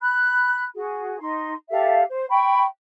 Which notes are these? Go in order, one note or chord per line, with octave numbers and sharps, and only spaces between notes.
B5 F#6
F#4 G#4
D#4 C6
G4 A4 E5 F5
C5
G5 B5 C#6